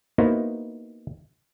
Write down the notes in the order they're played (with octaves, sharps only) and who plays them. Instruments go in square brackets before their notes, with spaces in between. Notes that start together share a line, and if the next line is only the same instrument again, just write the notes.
[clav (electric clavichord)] A#3 B3 D#4 E4 F#4 C5